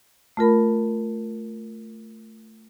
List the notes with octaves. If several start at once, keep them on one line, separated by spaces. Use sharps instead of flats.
A3 F4 A#4 B5